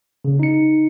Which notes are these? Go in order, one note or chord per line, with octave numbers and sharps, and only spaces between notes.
C#3
D#4 C#7